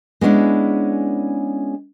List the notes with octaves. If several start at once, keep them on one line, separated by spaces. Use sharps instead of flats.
G#3 B3 C#4 D4 E4